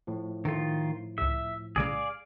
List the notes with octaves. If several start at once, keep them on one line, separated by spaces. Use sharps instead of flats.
A2 F3
D#3 A3 F4
C#2 G#2 E5
B1 C#3 G#3 G#4 D5 F5